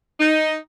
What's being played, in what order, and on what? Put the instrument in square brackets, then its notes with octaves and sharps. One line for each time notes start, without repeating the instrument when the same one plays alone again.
[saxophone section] D#4